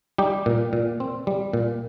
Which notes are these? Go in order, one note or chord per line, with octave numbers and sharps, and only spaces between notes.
G3 D#4 G4
A#2
A#2
C4
G3
A#2